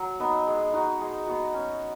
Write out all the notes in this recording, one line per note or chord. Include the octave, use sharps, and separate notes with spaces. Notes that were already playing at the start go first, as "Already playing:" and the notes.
Already playing: F#3
B3 D#4
G#3
D#4 F#4
G#3
B3 F#4
C#4